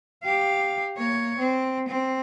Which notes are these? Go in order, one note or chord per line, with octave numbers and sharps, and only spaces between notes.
G4 F5
A#3 C#5
C4
C4